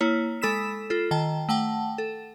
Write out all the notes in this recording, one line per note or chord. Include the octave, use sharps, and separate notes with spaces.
A#3 E4 C#5
G#3 A4 B5 E6 B6 E7
F4 A4
D#3 G5 A5
A3 F#5 G5 A5
A4